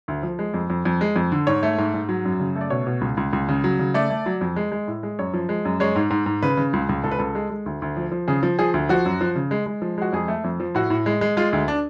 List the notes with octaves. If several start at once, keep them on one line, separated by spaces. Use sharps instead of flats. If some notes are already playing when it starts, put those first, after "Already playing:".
D2
F3
G#3
F2
F2
F2
G#3
F2
D3
G#2 C#5
A3
G#2
G#2
F#3
F#2
C#3
A3
D5
B2 C#5
B2
C#2
C#2
C#2
C#3
F#3
C#3
A3 D5
A3
F#3
F2
G#3
G#3
A2
G#3
F#2 C#5
F3
G#3
F#2
G#3 C#5
G#2
G#2
G#2
C#3 B4
C#3
C#2
C#2
C#2 A4
B4
C#2 A4
G#3
G#3
D2
D2
F3
F3
C#3 G#4
F3
F3 G#4
D2
F3 F#4
F#2
F3
C#3
G#3
G#3
F3
G#3 F#4
F2 G#4
A3
F2
F3
A2 F#4
A2
G#3
G#3
G#3 F4
D2
D4